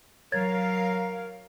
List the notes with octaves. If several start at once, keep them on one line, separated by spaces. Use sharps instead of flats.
F#3 A#4 C#5 F5 G#6 A6